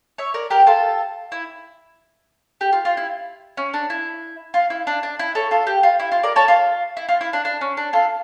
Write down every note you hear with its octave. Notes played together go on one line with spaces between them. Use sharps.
C#5 E5
A#4 D5
G4 A#4
F4 A4
E4
G4
F4
F4
E4
C#4
D4
E4
F4
E4
D4
D4
E4
A4 C#5
F4 A4
G4
F4
E4
F4
A#4 D5
A4 C#5
F4
E4
F4
E4
D4
D4
C#4
D4
F4 A4